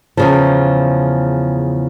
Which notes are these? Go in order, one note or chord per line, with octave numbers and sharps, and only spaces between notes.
E2 C#3 F3